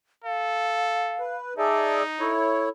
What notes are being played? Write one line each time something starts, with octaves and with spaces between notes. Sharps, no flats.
A4 F5
B4
D#4 G#4 D5 E5 A5
E4 A4 C#5